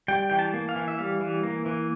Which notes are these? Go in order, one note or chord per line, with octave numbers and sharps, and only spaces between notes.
G3 G5
E3 G5
A5
A#3
F5
E3
E5
G3 F5
E3
A#3
E3